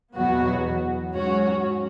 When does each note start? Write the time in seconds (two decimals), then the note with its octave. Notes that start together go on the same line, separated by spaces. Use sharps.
0.15 E2 B2 F#3 B3 F#4
1.14 G#2 F#3 C#4 F#4 C#5